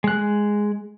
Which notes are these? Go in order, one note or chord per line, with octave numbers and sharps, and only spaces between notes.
G#3 F#6